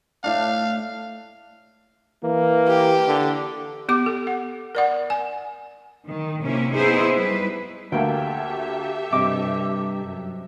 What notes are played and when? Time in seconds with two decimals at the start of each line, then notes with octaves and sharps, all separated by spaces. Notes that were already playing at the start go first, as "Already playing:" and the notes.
0.24 A2 D4 F5
2.24 E3 A#3
2.68 G4
3.07 D3
3.89 B3 G4 D6
4.06 A4
4.27 F#5
4.75 A#4 D5 F#5
5.10 G#5
6.06 D#3
6.42 C3 A#3 C#4 E4
6.75 B3 D#4 E4 G#4 C5
7.15 G3 B4
7.92 D2 A3 A#3 G4 A4 E5 G5
9.12 G2 C3 D#5 D6
10.04 F#2